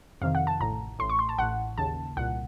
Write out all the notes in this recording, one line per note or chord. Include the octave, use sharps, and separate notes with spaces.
F2 C3 D#3 F5
F#5
A5
A1 A2 A#5
A1 A2 C6
C#6
C6
A5
A1 A2 F#5
D#2 C#3 A5
C2 A#2 F#5